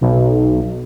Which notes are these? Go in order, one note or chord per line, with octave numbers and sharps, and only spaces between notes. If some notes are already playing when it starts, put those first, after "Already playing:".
B1